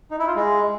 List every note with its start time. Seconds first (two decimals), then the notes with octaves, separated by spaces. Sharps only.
0.11 D#4
0.19 E4
0.27 F4
0.36 G#3